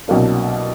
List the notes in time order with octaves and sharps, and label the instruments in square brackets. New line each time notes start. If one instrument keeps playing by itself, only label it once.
[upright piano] C2 B2 F#3 A#3 D4